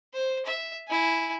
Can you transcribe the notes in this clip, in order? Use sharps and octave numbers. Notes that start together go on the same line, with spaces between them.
C5
E5
E4 G#5